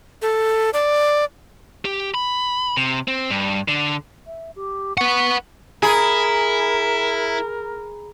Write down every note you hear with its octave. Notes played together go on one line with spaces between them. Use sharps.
A4
D5
G4
B5
C3
C4
G2
D3
E5
G4
B4 F#5 C#6
E4 G#4 A#4 A#5 B5